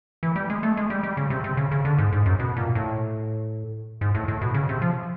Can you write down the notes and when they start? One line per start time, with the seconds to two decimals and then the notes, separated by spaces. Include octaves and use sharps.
0.23 E3
0.36 G3
0.50 G#3
0.63 A3
0.77 G#3
0.90 G3
1.03 G3
1.17 C#3
1.30 C3
1.44 C3
1.57 C#3
1.71 C#3
1.85 D3
1.99 G#2
2.12 G#2
2.26 F#2
2.39 B2
2.57 A#2
2.75 A2
4.01 G#2
4.15 A2
4.28 A2
4.41 B2
4.54 C#3
4.69 C3
4.82 F3